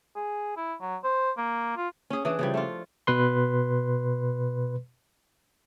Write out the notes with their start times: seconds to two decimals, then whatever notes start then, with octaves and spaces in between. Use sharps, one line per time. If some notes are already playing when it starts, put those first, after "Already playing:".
0.16 G#4
0.57 E4
0.81 F#3
1.04 C5
1.38 A#3
1.77 F4
2.10 C#4 G#4
2.25 E3 D4 G#4
2.39 C#3 F3 G3
2.54 A3 D4 F4
3.07 B2 B4 C6